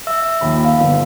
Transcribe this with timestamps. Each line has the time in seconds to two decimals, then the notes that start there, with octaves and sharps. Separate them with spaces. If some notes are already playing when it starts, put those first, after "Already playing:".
0.07 E5 E6
0.41 A#1 D#2 B5
0.65 F5
0.80 G1